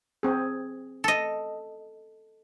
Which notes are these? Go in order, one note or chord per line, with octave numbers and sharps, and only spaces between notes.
C4 G#4
A4 D#5